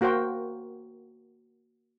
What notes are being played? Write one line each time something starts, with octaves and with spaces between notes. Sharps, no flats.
A#3 F#4 A#4 C5 G5